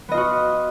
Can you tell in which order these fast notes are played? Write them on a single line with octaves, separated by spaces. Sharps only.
B3 D#5 F4 F#4